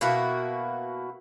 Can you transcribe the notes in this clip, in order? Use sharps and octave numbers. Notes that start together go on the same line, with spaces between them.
B2 A#3 E4 F#4